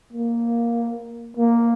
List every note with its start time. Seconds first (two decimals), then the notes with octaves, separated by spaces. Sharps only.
0.13 A#3
1.37 A#3